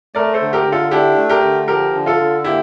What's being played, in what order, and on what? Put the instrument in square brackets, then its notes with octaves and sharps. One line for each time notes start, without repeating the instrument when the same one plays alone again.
[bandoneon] A3 [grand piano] A#4 D5
[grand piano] A4 C5
[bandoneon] D3
[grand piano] G4 A#4
[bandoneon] D3
[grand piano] F4 A4
[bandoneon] D4 [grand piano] E4 G4
[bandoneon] A3
[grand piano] G4 A#4
[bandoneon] D3
[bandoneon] F3 [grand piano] G4 A#4
[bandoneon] D3
[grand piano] F4 A4
[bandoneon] D3
[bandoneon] A#3 [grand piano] E4 G4